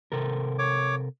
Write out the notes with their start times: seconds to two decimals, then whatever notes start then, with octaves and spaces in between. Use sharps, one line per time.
0.12 C3 A4 A#4
0.59 C#5 D6